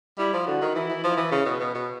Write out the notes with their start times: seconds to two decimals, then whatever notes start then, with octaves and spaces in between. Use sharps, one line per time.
0.18 G3 E4
0.33 F3
0.47 D3 F#4
0.62 D#3
0.75 E3 E4
0.89 E3
1.04 F3
1.17 E3
1.32 C#3
1.46 B2
1.60 B2
1.74 B2